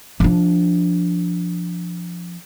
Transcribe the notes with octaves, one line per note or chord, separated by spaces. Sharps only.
F3 D4